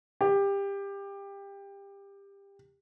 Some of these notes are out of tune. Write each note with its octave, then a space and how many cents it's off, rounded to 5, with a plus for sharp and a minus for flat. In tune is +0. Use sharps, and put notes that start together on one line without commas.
G4 +20